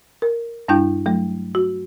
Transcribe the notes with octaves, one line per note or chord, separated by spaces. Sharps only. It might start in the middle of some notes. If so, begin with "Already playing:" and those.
A#4
G2 G3 D4 E4 G5 G6
F#3 A3
F#4